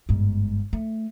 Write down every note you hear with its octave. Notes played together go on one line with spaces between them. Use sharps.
G1 G#2
A3